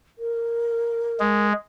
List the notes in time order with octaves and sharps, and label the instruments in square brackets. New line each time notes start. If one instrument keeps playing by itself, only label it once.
[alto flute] A#4
[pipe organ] G#3